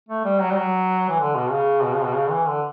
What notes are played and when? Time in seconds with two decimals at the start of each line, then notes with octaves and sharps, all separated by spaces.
0.09 A3
0.25 G3
0.41 F#3
0.51 G3
0.57 F#3
1.09 E3
1.20 D3
1.36 B2
1.52 C#3
1.84 B2
1.95 C#3
2.04 B2
2.15 C#3
2.31 E3
2.47 D3